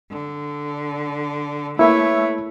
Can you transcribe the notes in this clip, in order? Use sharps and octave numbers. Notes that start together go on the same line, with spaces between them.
D3
A3 A#3 E4 B4 C#5 E5